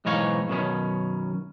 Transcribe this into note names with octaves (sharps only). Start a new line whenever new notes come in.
B1 G#2 E3 D#4 C#5 F5
F#2 B2 D#3 C#4